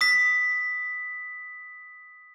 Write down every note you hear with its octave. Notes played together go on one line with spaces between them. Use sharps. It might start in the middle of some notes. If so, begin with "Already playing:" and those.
D#6 B6